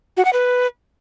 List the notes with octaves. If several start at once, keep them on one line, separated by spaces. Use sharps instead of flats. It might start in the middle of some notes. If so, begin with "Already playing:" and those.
F#4
F#5
B4